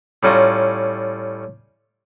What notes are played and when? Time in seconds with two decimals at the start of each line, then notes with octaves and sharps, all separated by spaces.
0.23 A2 G3 C#4 F4 A#5